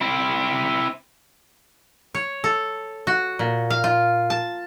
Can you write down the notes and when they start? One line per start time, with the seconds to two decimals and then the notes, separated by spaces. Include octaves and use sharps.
0.01 C4 E4
2.14 C#5
2.44 A4
3.07 F#4
3.39 A#2
3.70 F5
3.84 F4
4.30 A5